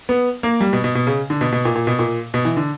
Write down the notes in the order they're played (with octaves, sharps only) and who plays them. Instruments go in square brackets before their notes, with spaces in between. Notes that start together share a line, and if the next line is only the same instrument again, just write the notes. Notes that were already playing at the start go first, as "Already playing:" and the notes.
[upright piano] B3
A#3
G3
B2
B2
B2
C#3
D3
B2
B2
A#2
A#2
B2
A#2
B2
E3
D3